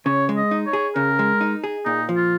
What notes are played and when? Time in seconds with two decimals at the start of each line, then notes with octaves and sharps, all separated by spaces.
0.06 C#3 C#5
0.29 G#3
0.37 D#5
0.51 D#4
0.67 C#5
0.73 G#4
0.95 C#3 A#4
1.19 G#3
1.41 D#4
1.64 G#4
1.85 A#2 D#4
2.09 F3
2.16 F4